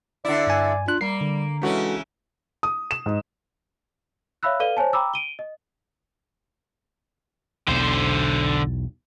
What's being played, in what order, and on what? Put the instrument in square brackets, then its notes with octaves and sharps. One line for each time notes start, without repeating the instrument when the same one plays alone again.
[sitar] D3 E4 [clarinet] D5
[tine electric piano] G2 G#5
[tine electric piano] D4 F#6 [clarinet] F4
[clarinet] G3 [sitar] A#3 [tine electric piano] C7
[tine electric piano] D3
[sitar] C#3 E3 C#4 [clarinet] G#3 [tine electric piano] D4 F#4 A4
[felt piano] D#6
E7
G#2
[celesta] C#5 E5 F5 B5 E6 F#6
A4 B4 D5 F5 D#7 G7
C5 C#5 G#5 A5
G5 A#5 B5 D6 E6
D7 D#7 G7
D#5
[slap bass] B1 E2 [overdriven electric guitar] D3 C5